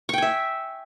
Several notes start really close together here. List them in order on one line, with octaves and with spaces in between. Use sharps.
C#6 G5 G#5 E5